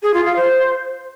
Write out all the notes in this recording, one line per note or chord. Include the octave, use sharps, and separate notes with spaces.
G#4
F4
F5
C5